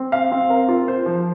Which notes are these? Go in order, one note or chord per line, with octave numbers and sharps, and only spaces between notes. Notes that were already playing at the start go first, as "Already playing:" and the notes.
Already playing: C4
F5
C4
A#4
F4
C5
F3